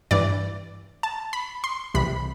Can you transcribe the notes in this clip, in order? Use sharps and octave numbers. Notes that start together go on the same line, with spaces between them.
G2 E3 D5
A5
B5
C6
C2 C3 E3 B5